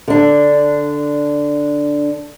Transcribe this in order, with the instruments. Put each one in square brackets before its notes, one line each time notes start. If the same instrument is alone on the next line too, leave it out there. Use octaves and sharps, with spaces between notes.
[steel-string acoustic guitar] D3 D4